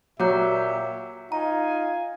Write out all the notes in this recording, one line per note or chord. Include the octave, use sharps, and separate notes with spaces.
A#2 F#3 G4 E5 A#5 D6 G6
D#4 F4 F5 G#5 A#5